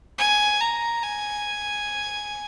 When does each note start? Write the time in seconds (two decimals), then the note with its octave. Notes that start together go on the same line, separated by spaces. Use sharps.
0.18 G#5
0.61 A#5
1.03 G#5